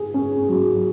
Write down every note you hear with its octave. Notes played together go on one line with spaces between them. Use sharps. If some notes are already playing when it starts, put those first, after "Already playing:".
Already playing: G#4
C#4
F#3